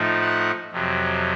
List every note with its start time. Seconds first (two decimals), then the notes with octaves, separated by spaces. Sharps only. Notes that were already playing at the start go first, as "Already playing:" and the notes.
Already playing: A2 F3 A3 D#4
0.21 F#5
0.72 F2 C3 F#3